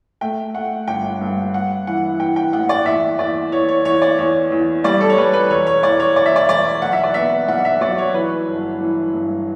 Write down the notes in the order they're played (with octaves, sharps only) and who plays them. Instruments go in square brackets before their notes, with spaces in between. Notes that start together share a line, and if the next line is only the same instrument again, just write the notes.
[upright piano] A3 G5
A3 F#5
G1 G5
G2
G2 F#5
E3 F#5
E3 G5
G5
A1 F#5
D5
E2 E5
E2 D5
E2 C#5
C#5
E2 C#5
D5
E2 C#5
E2
G3 D5
A4
C#5
G3 B4
B4
E1 C#5
C#5
E2 D5
C#5
E1 D5
E5
D5
E1 D5
B1 F#5
E5
D5
B3 E5
B1 F#5
E5
F#3 D5
C#5
E3 B4
G1
E3
G2